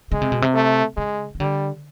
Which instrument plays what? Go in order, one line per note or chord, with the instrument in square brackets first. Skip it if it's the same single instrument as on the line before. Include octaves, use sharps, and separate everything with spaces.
[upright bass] C#3 [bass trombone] G#3
[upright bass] C3
B2
C3
[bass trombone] A3
[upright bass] C#3 [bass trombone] G#3
[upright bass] D#3
[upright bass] D3 [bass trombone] G3